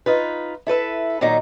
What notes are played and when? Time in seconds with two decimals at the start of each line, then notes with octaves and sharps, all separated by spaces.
0.06 D#4 F4 B4
0.67 E4 A4 B4 E5
1.21 A#2 D#3 F#3 D#4 A#5